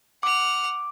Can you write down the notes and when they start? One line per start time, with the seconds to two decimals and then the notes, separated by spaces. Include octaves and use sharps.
0.23 F#5 D6 F6